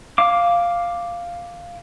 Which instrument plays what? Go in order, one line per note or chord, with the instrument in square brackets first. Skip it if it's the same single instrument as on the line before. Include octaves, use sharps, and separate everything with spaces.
[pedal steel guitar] F5 D6